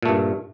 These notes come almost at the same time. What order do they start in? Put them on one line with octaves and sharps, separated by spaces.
A#2 A3 G2